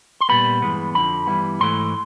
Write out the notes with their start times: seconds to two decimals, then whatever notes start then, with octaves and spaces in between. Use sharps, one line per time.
0.21 C6
0.29 A#2 G3 B3 B5
0.62 G2 E3 G#3 B3
0.95 F2 D3 F3 B5
1.27 G2 E3 G3 B3 E4
1.60 G#2 E3 A3 C6